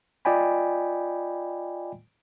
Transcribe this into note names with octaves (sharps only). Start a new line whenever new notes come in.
F4 D5 D#5 G5 G#5 B5